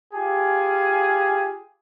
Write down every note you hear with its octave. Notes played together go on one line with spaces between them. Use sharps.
F4 G4 G#4 G#5